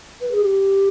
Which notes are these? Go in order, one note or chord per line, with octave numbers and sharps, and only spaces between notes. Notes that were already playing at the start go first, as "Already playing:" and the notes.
B4
G#4
G4